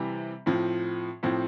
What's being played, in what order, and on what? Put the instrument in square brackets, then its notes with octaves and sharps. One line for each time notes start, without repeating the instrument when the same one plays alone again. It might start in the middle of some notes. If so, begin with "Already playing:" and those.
Already playing: [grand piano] C3 E3 G3
A2 F3 C4
A2 F3 C4